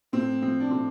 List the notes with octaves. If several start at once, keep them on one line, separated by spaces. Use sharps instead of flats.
A2 C4
F3 C4
D4
A2 C4